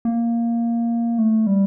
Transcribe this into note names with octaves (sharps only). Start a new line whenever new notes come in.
A#3
A3
G3